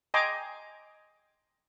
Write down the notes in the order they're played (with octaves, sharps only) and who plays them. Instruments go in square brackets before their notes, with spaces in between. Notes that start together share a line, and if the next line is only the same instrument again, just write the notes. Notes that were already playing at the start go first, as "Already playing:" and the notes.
[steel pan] D#5 G5 G#5 A#5 C6 D6